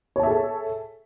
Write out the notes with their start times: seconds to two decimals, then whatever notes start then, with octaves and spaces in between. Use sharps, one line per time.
0.16 C#5
0.20 A5
0.23 E5
0.27 G#4
0.31 A4